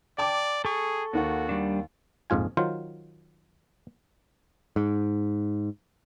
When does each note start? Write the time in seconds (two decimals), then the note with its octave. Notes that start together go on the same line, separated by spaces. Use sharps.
0.18 D5 G5 A5 D6
0.65 G#4 A4 C#6
1.13 D#2 D#3 F#4 F#5
1.49 G3 D4
2.30 A#1 F2 G#2 F4 G#5
2.57 D#3 F#3 F4 C5
4.76 G#2